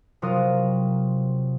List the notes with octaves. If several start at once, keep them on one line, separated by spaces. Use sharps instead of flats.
C3 F#3 F4 A#4 F5 D#6